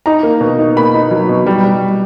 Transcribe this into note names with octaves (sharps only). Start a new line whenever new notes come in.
D#4 A#5
A#3
B2
D#4
A#3 B5
D#4
F#3
B2
G3
G3